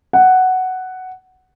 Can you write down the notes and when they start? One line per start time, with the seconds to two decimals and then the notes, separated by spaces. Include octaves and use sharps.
0.13 F#5